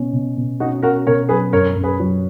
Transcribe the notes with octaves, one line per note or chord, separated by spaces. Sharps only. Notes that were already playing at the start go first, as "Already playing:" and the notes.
Already playing: B2 C#4
B2
B2
C#4 D#4 F#4
C#4 F#4 A#4
B2 A#4 C#5
F#3 G#4 B4
F#2 A#4 C#5
F#2
G#4 B4
F#3